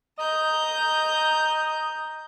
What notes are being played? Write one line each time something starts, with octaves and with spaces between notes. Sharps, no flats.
D#5 A#5 G6